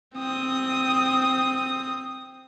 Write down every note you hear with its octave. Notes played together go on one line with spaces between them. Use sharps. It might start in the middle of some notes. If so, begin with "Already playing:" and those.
C4 D#6